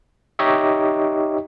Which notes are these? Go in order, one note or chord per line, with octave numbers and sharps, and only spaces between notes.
D#4 G4 C#5 D#5 E5